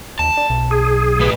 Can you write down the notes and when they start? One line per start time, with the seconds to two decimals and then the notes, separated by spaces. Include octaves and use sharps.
0.19 D#2 A5
0.37 D4
0.50 B1
0.71 G#4
1.20 A2 B4